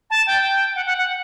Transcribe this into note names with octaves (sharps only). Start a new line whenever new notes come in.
A5
G5
G5
F#5
F#5
F#5